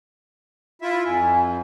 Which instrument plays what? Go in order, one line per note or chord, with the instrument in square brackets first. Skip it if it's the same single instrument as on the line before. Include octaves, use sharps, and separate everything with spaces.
[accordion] E4 F4 E5
[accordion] F2 [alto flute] G#5